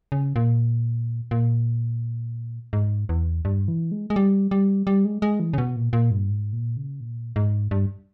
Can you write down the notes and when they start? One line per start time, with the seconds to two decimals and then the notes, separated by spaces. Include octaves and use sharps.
0.12 C#3
0.36 A#2
1.31 A#2
2.73 G#2
3.09 E2
3.45 G2
3.68 E3
3.92 G#3
4.10 G#3
4.16 G3
4.51 G3
4.87 G3
5.05 G#3
5.22 G#3
5.40 E3
5.54 C#3
5.58 B2
5.76 A#2
5.93 A#2
6.11 G2
6.29 G#2
6.53 A#2
6.77 C#3
7.00 A#2
7.36 G#2
7.71 G2